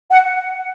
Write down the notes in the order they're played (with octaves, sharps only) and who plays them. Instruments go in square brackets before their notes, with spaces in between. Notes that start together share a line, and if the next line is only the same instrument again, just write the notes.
[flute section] F#5